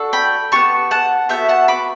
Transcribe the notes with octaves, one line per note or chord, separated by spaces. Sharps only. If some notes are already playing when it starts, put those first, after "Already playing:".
Already playing: D4 F#4 A4
G5 B5
B3 E4 G4 A5 C#6
F#5 A5
B3 F#4 A4 E5 G5
F#5 A5
B5 D6